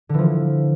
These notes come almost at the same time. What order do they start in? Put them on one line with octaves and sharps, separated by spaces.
D3 E3 F3